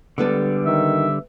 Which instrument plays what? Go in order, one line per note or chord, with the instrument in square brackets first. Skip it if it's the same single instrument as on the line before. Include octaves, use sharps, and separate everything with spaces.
[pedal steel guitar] D3 G3 [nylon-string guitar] G#3 B3 A4
[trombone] D#3 [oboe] E5